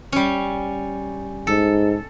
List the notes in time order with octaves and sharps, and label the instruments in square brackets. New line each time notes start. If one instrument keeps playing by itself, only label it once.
[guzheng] G3 C#4
[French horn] G#2 [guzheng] A4